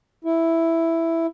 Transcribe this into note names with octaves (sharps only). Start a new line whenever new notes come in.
E4